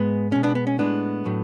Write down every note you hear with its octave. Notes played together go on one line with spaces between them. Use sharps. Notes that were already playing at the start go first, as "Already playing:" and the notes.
Already playing: G#2 G#3 B3
B2 G#3 C#4
B3 D4
B3
C#4
A2 G#3 B3 D4
A2 F#3 A3